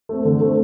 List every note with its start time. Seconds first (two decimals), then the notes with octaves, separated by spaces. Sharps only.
0.09 A3 C4
0.25 D3
0.41 A3 C4